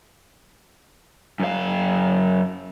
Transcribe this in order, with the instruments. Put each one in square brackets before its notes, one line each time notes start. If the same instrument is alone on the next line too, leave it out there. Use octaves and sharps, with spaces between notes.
[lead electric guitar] F#2 F5